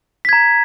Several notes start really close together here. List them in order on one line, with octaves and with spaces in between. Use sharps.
B6 G#6 A#5